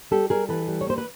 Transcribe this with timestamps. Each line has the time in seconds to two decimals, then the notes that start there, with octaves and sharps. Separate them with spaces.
0.11 G3 G4 A4
0.30 G3 G#4 A#4
0.49 E3 A4 B4
0.68 G3
0.81 C#5
0.87 A#3 C5
0.98 B4